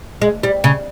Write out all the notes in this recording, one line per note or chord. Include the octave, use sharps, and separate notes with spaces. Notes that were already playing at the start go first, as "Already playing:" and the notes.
G#3
G3
C#3